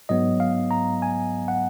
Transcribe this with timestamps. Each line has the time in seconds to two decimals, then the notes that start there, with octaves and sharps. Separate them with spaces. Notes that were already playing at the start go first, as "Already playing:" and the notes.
0.09 G#2 F#3 B3 D#5
0.40 F5
0.71 A#5
1.02 G#5
1.48 F#5